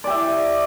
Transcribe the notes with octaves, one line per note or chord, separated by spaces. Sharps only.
G4 D5 E5